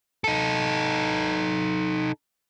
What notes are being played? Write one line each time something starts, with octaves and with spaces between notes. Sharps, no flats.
D#4 A4